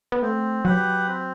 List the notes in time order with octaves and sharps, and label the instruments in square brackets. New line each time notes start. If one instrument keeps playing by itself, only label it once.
[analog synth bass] B3
[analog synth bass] A3 [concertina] C4
[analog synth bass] F#3 [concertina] G4 B4 F#5
[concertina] C4